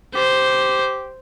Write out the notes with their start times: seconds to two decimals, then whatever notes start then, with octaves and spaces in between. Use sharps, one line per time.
0.15 G4 C5